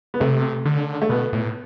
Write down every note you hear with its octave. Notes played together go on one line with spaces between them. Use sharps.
B3
C3 A3
D3
A3
B2 B3
A2